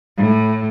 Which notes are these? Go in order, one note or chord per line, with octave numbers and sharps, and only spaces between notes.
A2